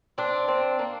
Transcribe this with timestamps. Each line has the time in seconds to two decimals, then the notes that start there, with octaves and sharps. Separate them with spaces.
0.18 C4 D4
0.48 C4
0.79 A#3